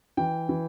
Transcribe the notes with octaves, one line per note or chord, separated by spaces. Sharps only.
E3 G5
E3